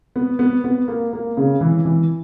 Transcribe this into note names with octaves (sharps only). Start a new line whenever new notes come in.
B3
B3
B3
A#3
A#3
C#3
E3
E3